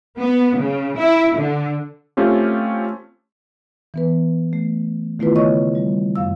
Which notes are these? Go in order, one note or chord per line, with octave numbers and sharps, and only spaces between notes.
B3
C#3
E4
D3
A3 C4 C#4 F4 G4
E3 B3 B4
A3
D#3 A3 B3 E4 F4 B4
C#3 C#5 D#5 C#6
G3
F#2 F5 E6